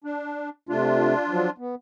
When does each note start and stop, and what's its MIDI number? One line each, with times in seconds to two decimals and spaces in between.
0.04 0.49 62
0.69 1.14 48
0.69 1.14 57
0.69 1.50 62
0.69 1.50 65
1.29 1.48 53
1.29 1.48 54
1.58 1.75 59